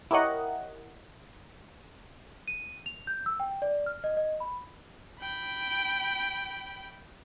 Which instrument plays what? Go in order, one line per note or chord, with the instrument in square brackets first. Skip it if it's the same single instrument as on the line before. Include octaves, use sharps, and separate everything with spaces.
[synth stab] E4 G4 A#4 C#5 D#5 F#5
[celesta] D#7
F7
G6
E6
G5
D5
F6
D#5
D#5
B5
[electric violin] G5 B5